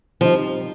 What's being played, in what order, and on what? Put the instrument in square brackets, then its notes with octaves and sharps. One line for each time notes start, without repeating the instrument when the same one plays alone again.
[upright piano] D#3 G3 C4 D#4 [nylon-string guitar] F3